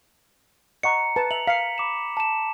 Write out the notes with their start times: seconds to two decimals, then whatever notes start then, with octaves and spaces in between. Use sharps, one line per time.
0.83 D#5 F#5 A#5 C#6 C#7
1.16 B4 A5
1.31 E5 F7 F#7
1.47 F5 B6 C#7
1.78 B5 D6 E7
2.17 A5 E7